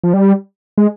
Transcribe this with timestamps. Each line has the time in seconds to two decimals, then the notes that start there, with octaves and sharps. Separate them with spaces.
0.04 F3
0.14 G3
0.78 G#3